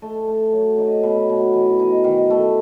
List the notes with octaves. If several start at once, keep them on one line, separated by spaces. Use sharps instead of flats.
A3
A3
F#3
D#4
B2
B2
E3
D#4
D#3
A3